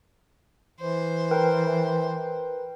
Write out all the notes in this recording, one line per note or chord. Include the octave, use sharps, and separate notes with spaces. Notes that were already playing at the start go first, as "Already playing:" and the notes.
E3 C5
A#4 B4 G5